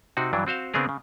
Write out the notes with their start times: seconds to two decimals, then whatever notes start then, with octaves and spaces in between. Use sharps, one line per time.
0.17 C3 C4 D#4 F#4
0.33 G2 E3 F#3 D4
0.47 C4 F#4 C5 F5
0.74 C#3 B3 C4 D4 G#4 A#4
0.89 C#3